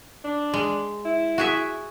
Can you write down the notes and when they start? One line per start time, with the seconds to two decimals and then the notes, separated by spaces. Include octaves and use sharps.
0.24 D4
0.54 G#3
1.05 E4
1.38 F#4 G#4 E5